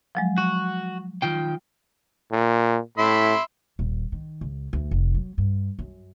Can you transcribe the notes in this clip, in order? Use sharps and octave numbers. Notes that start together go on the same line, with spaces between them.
F3 F#3 G#3
F#4
D#3 F4 G5
A#2
A2 E5 B5 C6
D#1
D#3
C#2
D2
F1
F#3
G2
F#2